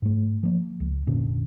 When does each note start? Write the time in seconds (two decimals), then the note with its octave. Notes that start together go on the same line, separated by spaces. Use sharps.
0.02 G#2 A3
0.43 F3 A#3
0.80 C#2
1.07 F1 A#2 D3 C#4